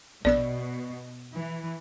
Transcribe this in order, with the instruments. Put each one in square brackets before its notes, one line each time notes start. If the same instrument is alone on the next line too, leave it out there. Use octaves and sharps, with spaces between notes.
[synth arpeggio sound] A#1 B3 E6 [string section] B2 [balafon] D5
[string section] E3